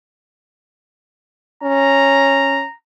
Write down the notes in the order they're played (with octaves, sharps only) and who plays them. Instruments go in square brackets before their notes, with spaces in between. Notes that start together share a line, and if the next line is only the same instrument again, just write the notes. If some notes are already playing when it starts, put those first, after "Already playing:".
[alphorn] C#4 [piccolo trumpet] A#5